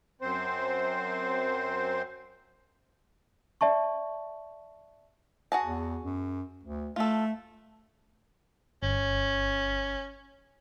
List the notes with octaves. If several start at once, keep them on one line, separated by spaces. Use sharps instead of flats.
F#2 C4 C5
D5 E5 A5 C#6
F#4 G#4 A5
E2
F#2
D2
A3 F4 A4
G1 C#4